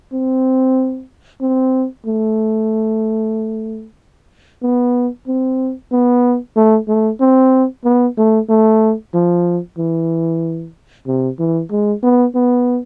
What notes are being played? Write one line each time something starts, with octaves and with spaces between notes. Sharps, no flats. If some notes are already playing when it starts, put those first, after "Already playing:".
C4
C4
A3
B3
C4
B3
A3
A3
C4
B3
A3
A3
F3
E3
C3
E3
G#3
B3
B3